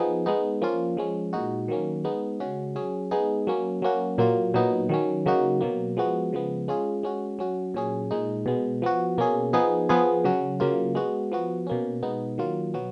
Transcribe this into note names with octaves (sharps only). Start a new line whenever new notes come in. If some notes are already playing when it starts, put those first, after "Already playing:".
Already playing: F3 B3 D#4 G#4
G#3 B3 D#4
F3 A#3 C#4 F4
F3 G#3 C#4
A#2 G#3 D#4 F#4
D#3 F#3 A#3 C#4
G#3 B3 D#4
C#3 G#3 C#4 F#4
F#3 C#4 G#4
G#3 B3 D#4 G#4
F#3 A#3 C#4
F#3 A#3 C#4 F#4
A#2 F#3 A#3 F4
A#2 F#3 B3 D#4
D#3 F#3 C#4
C#3 F#3 A#3 D#4 F#4
B2 F#3 A#3
F3 G#3 B3 F#4
C#3 F3 G#3 B3
G#3 C#4 F4 G#4
G#3 C#4 F#4
F#3 C#4 F#4
A#2 F#3 C#4 G#4
A#2 G#3 D#4
B2 G#3 B3
F3 B3 F#4
B2 A#3 C#4 G#4
F3 B3 D#4 G#4
F3 B3 F4 G#4
C#3 F#3 C#4 F#4
C#3 F#3 A#3 F4
G#3 B3 F#4
F3 B3 F#4
B2 A#3 C#4
B2 G#3 B3 D#4
D#3 F#3 A#3 F4
B2 F#3 B3 F#4